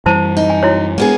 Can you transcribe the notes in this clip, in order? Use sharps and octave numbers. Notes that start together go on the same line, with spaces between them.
F#2 E3 G3 E4 C5 A5
D#4
G#5
E4 F#4 C#5
G#3 A#3 B3 D4 G#4